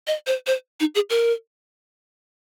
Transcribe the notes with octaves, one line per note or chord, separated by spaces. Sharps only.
D#5
C5
C5
D#4
G#4
A#4